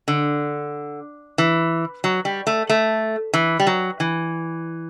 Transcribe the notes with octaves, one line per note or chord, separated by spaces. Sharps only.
D3
E3
F#3
G3
A3
A3
E3
G3
F#3
E3